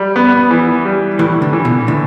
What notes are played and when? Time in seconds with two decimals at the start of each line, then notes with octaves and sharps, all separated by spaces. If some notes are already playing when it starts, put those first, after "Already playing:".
Already playing: G3
0.16 B3
0.51 E3
0.85 G3
1.19 A2 E3
1.42 D3
1.53 E3
1.65 B2
1.88 A2 D3